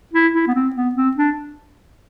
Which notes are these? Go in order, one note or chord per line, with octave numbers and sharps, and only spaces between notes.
E4
E4
B3
C4
B3
C4
D4